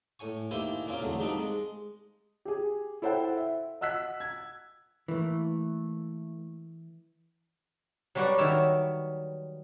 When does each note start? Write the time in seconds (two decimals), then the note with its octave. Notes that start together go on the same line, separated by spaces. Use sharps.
0.19 A2 C#5 G#5 C#6
0.51 D#3 A#3 E4 G4 C5 G#5
0.86 A#2 A#3 C4 C#4 F4
1.01 E2 D3 F#3 A3
1.19 D#3 F3 G3 C4 D4 D#4
1.39 G#3
2.45 G4 G#4
3.02 E4 A4 C5 F#5 G5
3.37 E5
3.81 D#5 F#5 E6 F#6 B6
4.20 G#6
5.08 E3 A3 A#3
8.15 F#3 G3 F#4 B4 D5 F#5
8.38 D#3 B4 C#5 E5